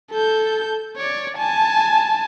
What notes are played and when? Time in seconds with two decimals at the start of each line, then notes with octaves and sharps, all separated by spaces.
0.11 A4 G6
0.97 C#5 D5
1.38 G#5 A5